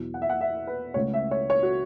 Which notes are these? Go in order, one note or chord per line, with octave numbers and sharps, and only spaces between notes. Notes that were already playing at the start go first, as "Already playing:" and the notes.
Already playing: E2 B2 F#3
F#5
E5
F#5
E5
B4
C#2 C#3 A3 C#5
E5
C#5
C#5
F#4